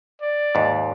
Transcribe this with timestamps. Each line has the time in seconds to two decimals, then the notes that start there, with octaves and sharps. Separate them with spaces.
0.22 D5
0.55 D#2 G#2